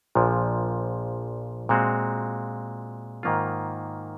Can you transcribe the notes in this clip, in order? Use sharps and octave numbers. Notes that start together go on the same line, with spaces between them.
A#1 A#2 F3
A#2 G#3 C4 F#4
G#2 D#3 A#3 F4